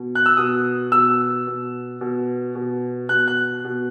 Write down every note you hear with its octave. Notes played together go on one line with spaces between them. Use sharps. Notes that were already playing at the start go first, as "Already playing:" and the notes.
Already playing: B2
F#6
E6
B2 D#6
B2 E6
B2
B2
B2
B2 F#6
F#6
B2